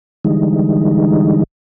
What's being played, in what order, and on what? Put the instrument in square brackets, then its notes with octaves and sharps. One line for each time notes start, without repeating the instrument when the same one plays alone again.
[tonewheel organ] D3 E3 G3 G#3 D#4